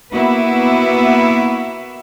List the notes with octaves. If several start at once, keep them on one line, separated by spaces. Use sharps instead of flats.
A#3 B3 E4 F#4 B4 E5